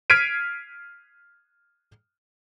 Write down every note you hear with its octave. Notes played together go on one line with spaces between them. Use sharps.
F6 G#6 B6 C7 D7 D#7